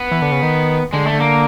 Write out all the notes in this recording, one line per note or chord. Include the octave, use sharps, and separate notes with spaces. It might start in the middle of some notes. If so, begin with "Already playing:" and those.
Already playing: B3
E3
D3
C#3
D#3
D3 G#3
A3
D3
A#3